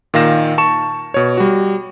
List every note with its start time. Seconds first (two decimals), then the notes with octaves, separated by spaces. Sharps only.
0.14 A#2 D#3 F5 A#6 E7
0.58 A5 C#6 E7
1.14 B2 C#5
1.37 G3 F#4